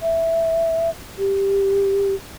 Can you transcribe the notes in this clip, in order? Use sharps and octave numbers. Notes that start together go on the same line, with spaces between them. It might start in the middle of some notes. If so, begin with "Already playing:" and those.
E5
G4